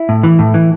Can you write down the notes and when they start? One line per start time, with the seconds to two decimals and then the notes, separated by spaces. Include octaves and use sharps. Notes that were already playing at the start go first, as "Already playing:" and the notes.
Already playing: E4
0.09 A2
0.23 E3
0.39 A2
0.54 E3